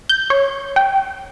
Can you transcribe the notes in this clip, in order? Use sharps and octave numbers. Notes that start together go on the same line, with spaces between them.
G6
C#5
G5